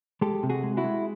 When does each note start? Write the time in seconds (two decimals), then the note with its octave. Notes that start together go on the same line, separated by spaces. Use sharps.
0.21 G#3 G4 A4
0.43 C3
0.50 F#4 G#4
0.63 G#3
0.77 E4 F#4
0.84 G#3